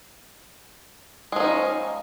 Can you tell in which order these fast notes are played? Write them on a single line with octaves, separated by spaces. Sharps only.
G#3 F3 D#4 C#4